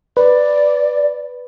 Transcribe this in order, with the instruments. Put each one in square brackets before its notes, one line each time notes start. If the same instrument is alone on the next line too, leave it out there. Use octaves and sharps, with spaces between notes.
[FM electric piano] B4 [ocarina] D5